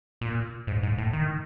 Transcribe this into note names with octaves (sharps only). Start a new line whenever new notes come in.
A#2
G#2
G#2
A2
D#3